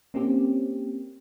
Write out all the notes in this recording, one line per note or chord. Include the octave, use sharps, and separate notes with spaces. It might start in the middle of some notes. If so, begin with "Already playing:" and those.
A#3 C4 C#4 G4